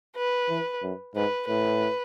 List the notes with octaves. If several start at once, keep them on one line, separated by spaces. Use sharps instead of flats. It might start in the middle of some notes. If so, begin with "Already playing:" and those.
B4
E3
F#2
G#2 B4
A2 B4